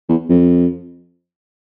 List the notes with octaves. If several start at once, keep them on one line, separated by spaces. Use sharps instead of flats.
E2
F2